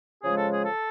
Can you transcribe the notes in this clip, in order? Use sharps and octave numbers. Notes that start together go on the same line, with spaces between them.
C#3 F3 G#3 G#4
A4
G#4
A4